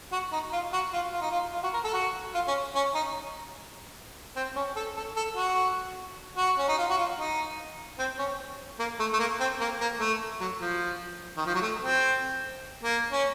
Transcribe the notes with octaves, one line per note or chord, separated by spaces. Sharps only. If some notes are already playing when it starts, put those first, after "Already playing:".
F#4
D#4
F4
F#4
F4
F4
D#4
F4
F4
F#4
A#4
A4
F#4
F4
C#4
C#4
D#4
C4
C#4
A4
A4
A4
F#4
F#4
C#4
D#4
F4
F#4
F4
D#4
C4
C#4
A#3
A3
A3
A#3
C4
A#3
A#3
A3
F#3
F3
D#3
F3
F#3
A3
C4
A#3
C#4